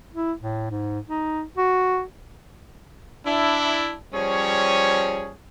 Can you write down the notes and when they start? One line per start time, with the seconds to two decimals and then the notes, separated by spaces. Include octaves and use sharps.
0.14 E4
0.41 A2
0.70 G#2
1.09 D#4
1.58 F#4
3.26 D4 E4
4.14 F3 G3 C#4 G#4 C#5